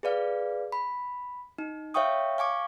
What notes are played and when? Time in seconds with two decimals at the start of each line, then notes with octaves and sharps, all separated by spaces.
0.03 G#4 B4 D5 F5
0.72 B5
1.58 D#4
1.94 C#5 E5 F5 G5 C#6 D#6
2.38 F5 G#5 C#6 D6